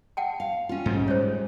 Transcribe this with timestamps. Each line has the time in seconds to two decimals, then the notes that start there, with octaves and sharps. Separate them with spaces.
0.17 F#5 G5 A5
0.40 F5
0.69 C#4 F4
0.86 G#2 G3
1.08 G#3 C5 C#5